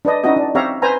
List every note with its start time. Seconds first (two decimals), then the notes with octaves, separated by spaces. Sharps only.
0.05 D4 B4 D#5
0.24 C#4 D#4 E4 F#4 D#5
0.37 D4
0.55 C4 G4 C#5 E5 F5 A#5
0.82 B4 C5 G#5 A#5